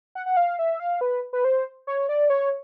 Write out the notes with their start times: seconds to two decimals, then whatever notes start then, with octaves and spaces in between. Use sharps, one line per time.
0.15 F#5
0.26 F#5
0.37 F5
0.59 E5
0.80 F5
1.01 B4
1.33 B4
1.44 C5
1.87 C#5
2.09 D5
2.30 C#5